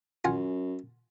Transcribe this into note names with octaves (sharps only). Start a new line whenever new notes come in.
F#2 F4 F#5 G#5